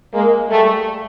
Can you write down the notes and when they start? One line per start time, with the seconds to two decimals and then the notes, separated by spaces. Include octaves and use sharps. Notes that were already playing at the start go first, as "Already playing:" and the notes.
0.14 G#3 A#3
0.50 G3 A3